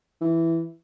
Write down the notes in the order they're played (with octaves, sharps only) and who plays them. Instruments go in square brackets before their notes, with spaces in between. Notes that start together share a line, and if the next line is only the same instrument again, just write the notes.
[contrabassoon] E3